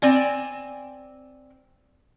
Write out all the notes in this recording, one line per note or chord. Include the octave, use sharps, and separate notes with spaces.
C4 D5 G#5